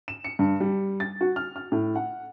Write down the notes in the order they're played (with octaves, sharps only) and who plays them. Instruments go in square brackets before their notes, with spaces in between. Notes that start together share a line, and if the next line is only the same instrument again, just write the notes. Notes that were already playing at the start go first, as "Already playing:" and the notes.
[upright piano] E7
C#7
G2
G3
A6
F#4
F6
F6
A2
F#5